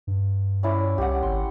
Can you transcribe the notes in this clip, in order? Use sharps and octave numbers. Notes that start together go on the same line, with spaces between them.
G2
C#4 E4 D5
C2 G4 F#5
G#1 C6